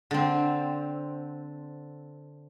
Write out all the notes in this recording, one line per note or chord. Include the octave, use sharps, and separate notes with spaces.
D3 C4